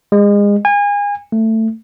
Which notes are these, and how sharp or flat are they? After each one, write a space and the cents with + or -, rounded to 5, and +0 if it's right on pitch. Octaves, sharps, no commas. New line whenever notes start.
G#3 -30
G#5 -30
A3 +15